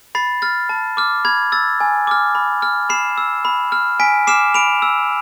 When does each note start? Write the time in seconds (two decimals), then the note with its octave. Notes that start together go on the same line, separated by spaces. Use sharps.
0.15 B5 A6 C7
0.42 F6 A6
0.69 A5
0.97 D6 F6
1.25 B5 G#6
1.52 E6 A6
1.80 G#5
2.07 D6 F6
2.35 B5
2.62 F6
2.90 B5 C7 E7
3.18 E6
3.45 B5
3.72 F6
4.00 G#5 B6 D7
4.27 D6 F6 C7 E7
4.54 B5 D7 F7
4.82 E6